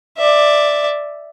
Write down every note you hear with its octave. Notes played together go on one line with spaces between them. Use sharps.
D5 E5